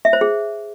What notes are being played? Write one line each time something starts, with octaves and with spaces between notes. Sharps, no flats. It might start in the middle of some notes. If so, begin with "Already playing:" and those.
E5
C5
G#4